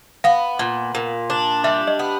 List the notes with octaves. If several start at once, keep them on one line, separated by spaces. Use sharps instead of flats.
B3 F5
A#2
A#2
D4
G3 E5
D#5
B3